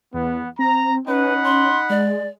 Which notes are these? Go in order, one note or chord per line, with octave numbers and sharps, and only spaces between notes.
E2 B3
C4 A#5
C#4 D#4 B4 F#5 B5
C6
G#3 D5